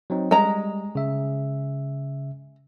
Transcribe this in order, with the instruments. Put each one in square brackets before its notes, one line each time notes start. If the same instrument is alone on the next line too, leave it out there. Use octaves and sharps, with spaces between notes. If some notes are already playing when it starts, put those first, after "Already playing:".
[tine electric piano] F#3 C4 D#4
[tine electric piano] G3 [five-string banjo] G#3 A#5
[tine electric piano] C#3 E5